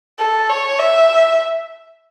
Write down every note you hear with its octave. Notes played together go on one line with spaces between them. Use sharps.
A4
C#5
E5